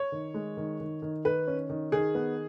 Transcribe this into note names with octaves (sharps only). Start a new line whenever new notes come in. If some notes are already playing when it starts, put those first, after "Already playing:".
Already playing: C#5
D#3
G#3
D#3
D#3
D#3
D#3 B4
C#4
D#3
D#3 G#4
B3